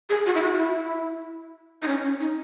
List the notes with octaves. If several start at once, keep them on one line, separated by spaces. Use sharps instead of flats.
G#4
F#4
E4
F#4
F#4
E4
D#4
C#4
C#4
D#4